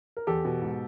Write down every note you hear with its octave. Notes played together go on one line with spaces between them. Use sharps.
A#4
E2 G4 A4
B2
G#2